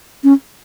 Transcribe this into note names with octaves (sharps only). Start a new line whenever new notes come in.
C#4